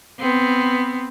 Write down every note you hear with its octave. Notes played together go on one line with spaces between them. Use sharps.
B3 C4